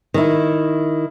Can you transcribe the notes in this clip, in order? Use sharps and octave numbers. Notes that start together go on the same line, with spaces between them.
D#3 E4